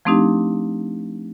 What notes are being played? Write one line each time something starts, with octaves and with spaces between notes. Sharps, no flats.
F3 A3 C4 D4 D#4 G4